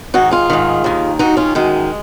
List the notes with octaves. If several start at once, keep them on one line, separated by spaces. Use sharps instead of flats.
G#2 D#3 D#4 F#4
F4 G#4
G#2 D#3
D#2 D#3
D#2 D#3 D#4 F#4
C#4 F4
F#2 D#3 G#3